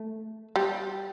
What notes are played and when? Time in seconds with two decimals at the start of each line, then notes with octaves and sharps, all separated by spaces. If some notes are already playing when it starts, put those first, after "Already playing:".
Already playing: A3
0.56 G3